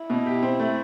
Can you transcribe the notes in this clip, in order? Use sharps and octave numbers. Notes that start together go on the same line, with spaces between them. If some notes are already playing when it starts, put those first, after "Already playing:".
Already playing: E4
B2
G4
C4
A3